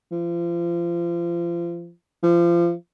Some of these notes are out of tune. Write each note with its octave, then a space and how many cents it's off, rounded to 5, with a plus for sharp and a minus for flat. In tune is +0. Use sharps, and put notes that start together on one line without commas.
F3 -30
F3 -30